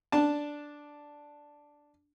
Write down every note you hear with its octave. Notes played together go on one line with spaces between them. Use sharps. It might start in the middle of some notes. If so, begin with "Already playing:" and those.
D4 A5